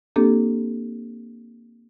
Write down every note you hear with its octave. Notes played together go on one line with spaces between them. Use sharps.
A#3 C4 D4 G4 A4